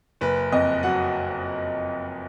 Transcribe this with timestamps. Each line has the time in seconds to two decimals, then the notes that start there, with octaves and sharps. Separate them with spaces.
0.21 F#1 B4
0.52 F2 D#5
0.83 F#3 F#5